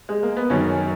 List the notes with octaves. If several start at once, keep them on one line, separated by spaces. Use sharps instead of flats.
G#3
A#3
B3
F#2 D#3 F#3 C#4